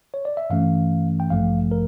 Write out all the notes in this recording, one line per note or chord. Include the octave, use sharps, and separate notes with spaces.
C#5
D5
E5
G2 E3 A3 C#4 F5
G5
A1 G2 F3 A3 F5
A#4